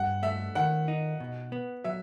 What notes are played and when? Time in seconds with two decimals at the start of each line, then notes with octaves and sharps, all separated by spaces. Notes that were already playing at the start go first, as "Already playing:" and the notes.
Already playing: G2 F#5
0.23 A3 E5
0.55 D#3 F#5
0.88 D#4
1.20 B2
1.52 B3
1.84 F#3 E5